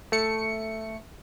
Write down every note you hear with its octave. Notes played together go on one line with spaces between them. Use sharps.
A3 C#7